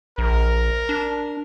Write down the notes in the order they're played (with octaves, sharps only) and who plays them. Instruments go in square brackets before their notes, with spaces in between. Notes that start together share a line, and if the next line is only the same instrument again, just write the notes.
[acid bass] A#1 [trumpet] A#4
[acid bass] D4